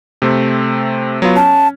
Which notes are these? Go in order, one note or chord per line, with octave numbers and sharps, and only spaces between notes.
C3 A3 C4
F#3 B3 F4
C#4 A5